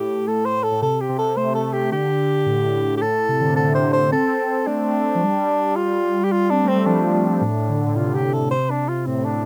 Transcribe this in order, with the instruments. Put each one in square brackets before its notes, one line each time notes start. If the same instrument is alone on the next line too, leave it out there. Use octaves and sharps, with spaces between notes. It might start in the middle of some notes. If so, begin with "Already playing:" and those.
Already playing: [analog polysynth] A2 [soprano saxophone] G4
[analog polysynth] A2 [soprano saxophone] A4
[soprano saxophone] C5
A4
[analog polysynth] A2
[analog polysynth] C3 [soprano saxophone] A4
[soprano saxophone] G4
[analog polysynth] C3
[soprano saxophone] A4
[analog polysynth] A3 [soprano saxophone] C5
[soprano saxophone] A4
G4
[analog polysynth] D3 [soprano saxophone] G4
[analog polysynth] A2
[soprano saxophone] G4
[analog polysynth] A2 [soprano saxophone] A4
[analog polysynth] C3
D3
[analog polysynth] C3 [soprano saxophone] A4
[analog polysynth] D3
[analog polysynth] C3 [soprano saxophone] C5
[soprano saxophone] C5
[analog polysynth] C4 [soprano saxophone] A4
[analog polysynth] A3 [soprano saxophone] D4
[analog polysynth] F3
G3
[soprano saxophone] F4
G4
F4
[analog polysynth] C4 [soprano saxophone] D4
[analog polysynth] A3
[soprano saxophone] C4
[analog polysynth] G3
[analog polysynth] F3 [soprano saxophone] D4
[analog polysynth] F3
A2
D3
A2
[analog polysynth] C3 [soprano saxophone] F4
[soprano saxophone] G4
A4
C5
D4
F4
[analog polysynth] A2 [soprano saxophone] C4
[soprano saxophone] D4